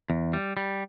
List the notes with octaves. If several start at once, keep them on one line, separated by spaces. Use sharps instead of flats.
E2
G3
G3